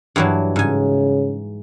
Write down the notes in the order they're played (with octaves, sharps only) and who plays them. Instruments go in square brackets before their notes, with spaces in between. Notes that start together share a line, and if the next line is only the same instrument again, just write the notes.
[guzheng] G2 E3 F#3
[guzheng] G#2 G#5 [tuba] C#3